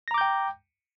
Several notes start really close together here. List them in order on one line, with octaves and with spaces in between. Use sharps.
A#6 A#5 D6 G6 G5